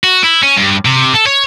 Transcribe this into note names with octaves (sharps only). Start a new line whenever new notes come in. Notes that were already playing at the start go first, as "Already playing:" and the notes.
F#4
E4
C#4
G2
C3
A4
C#5